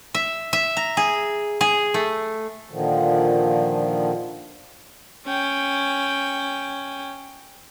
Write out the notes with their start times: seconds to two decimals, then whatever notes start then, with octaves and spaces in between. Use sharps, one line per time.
0.15 E5
0.53 E5
0.77 A#5
0.97 G#4
1.61 G#4
1.94 A3
2.71 A#2 D3 D#3 F3
5.26 C#4 G5